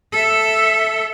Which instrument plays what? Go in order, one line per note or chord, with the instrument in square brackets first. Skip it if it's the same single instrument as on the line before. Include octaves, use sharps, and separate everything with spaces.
[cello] A4 E5